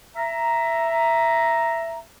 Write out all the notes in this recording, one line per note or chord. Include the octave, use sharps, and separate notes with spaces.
E5 A#5